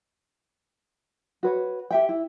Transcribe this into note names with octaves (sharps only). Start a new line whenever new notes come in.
F#4 B4 C#5
G4 E5 G5
E4